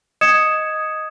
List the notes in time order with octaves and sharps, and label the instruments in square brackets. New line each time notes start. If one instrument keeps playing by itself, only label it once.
[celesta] D#5 D#6 G#6 C#7 E7